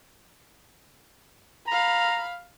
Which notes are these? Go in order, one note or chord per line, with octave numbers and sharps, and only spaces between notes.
F5 A#5 B5